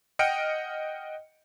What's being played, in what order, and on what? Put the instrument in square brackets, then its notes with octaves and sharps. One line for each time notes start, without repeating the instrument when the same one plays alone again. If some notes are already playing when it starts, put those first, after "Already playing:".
[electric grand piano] D#5 F#5 G5 F6 C#7 D7